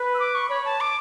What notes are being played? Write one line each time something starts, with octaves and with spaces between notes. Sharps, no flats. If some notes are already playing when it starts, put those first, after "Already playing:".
Already playing: B4
E6
D6
C#6
C#5 B5
A5
D6